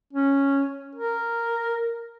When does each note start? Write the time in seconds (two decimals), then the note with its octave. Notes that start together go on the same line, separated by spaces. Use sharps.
0.13 C#4
0.95 A#4